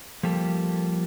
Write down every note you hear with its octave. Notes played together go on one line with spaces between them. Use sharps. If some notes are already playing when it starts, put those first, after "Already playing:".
F3 G3 A#3 G4 A4